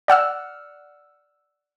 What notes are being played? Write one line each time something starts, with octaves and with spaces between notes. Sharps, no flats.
D5 F#5 E6 F6